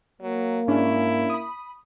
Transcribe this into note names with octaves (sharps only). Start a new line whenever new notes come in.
F#3 A#3
G#2 C#4 D4 E4
B5 D#6